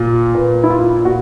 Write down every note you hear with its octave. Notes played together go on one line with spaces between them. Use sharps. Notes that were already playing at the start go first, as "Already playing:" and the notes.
Already playing: A#2
A#2 B4
E4
F4
A#2 F#4